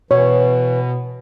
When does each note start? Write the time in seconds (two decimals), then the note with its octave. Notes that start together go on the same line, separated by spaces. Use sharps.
0.11 B2 E3 C#5